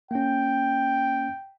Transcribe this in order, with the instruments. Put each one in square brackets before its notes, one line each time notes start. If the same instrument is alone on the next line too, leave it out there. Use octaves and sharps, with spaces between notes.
[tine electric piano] A#3 C#4 [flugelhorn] G5